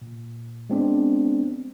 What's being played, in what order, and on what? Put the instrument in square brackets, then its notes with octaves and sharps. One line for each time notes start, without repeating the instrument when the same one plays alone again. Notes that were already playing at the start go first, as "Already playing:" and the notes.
[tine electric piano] A#2
G#3 B3 C4 D4